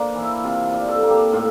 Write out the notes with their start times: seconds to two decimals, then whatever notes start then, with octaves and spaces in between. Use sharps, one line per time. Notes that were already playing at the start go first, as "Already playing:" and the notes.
Already playing: A#3 D4 C5 D5
0.15 E3
0.22 E4
0.44 C3 F4
0.66 F4
0.73 D4
0.88 A4
1.03 A#3
1.10 G4
1.32 A2 F4